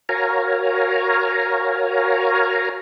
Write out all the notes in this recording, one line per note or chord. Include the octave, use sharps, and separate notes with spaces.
F#4 A#4 C#5 F5 G#5 A#5